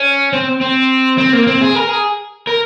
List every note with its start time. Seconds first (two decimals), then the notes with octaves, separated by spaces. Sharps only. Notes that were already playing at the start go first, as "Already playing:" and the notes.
Already playing: C#4
0.33 C4
0.61 C4
1.18 C4
1.33 A#3
1.47 C4
1.61 G#4
1.75 A#4
1.89 G#4
2.47 A#4